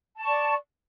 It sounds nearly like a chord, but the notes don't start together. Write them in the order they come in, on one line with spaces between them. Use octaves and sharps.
A5 C#6 D5